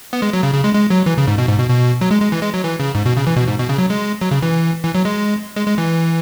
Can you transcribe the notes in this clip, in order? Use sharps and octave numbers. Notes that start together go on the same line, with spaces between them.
B3
G#3
F#3
C#3
C#3
G#3
G#3
F#3
E3
C#3
G#2
B2
G#2
B2
B2
F#3
G#3
G#3
E3
G#3
F#3
E3
C#3
G#2
B2
C#3
E3
B2
G#2
B2
C#3
F#3
G#3
F#3
C#3
E3
E3
F#3
G#3
G#3
G#3
E3